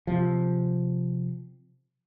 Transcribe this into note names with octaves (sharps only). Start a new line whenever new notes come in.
C3 F3